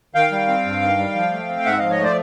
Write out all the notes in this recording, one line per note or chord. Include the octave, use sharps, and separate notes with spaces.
D#3 F5 G5
G3
C4
G2
D#3
G3
F3
A3
C4
G#2 E5 F#5
F3 D#5 F5
C#5 D#5
A3 C5 D5